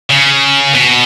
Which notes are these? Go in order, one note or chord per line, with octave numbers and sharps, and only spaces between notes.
C#3
B2